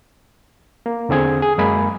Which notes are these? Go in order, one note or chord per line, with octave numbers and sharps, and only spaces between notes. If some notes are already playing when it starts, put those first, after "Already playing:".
A#3
E2 D3 C4 G#4 G#6
G#4
F#2 G#3 A#3 G#5 B5